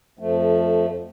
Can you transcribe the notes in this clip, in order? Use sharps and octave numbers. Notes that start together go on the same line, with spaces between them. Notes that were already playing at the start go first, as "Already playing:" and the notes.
F2 F3 A3